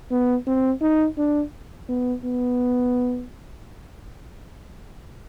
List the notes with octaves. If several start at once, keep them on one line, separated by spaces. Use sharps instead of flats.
B3
C4
D#4
D4
B3
B3